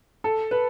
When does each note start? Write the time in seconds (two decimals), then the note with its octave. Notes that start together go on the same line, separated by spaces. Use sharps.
0.24 A4
0.51 B4